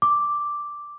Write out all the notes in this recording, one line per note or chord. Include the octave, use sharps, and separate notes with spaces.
D6